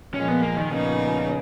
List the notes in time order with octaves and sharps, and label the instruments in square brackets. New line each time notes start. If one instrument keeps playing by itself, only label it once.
[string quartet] A#2 F3 G#3 [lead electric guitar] C#4
[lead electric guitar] B3
A#3
D#3
[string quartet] A#2 F3 B3 D#4 [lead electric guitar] C#3